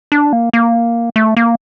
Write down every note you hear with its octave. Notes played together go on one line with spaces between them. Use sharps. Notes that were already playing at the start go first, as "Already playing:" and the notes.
D4
A#3
A#3
A3
A#3